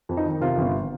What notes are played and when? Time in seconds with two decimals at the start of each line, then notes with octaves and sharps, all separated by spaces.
0.09 F2
0.17 D#4
0.26 D#3
0.41 C3 F4
0.58 G1